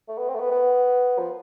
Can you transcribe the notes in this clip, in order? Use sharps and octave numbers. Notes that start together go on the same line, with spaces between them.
A3
B3
C4
A3
B3
B3
F3